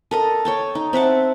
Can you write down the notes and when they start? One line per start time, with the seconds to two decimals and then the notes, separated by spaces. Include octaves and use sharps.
0.11 A4 A#4 D#5
0.45 C#5 G5 A5
0.75 D#4
0.93 C4 E5 F#5 A5